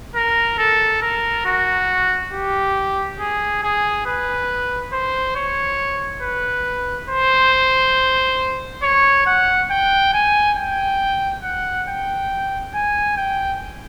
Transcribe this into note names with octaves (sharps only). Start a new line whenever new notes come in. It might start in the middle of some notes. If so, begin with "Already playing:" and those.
A#4
A4
A#4
F#4
G4
G#4
G#4
B4
C5
C#5
B4
C5
C#5
F#5
G5
G#5
G5
F#5
G5
G#5
G5